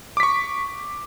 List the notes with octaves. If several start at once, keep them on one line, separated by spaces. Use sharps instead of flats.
C#6 D6 B6